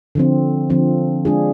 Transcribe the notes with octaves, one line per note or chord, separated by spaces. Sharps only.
D3 F3 C4
D3 F3 C4
G#3 D4 F4 G#4